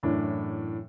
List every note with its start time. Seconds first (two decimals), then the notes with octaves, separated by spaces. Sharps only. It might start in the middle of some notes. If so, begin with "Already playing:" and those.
0.03 F#2 A2 E3 D4